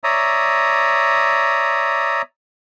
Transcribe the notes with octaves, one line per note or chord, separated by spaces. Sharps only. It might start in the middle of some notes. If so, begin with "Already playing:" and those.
C#5 D5 E5 A#5 D#6